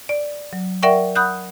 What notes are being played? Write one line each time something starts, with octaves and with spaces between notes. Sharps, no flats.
D5
F#3
A#4 D5 E5 F#5 G5 C#6
F#5 B5 D#6 F#6 G6